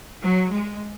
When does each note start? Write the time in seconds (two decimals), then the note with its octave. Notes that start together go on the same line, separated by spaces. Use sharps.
0.24 F#3
0.52 G#3